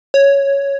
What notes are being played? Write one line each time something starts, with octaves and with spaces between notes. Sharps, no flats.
C#5